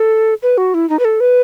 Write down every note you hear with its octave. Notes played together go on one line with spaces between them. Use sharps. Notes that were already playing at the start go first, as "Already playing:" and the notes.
Already playing: A4
B4
F#4
E4
D#4
B4
A4
B4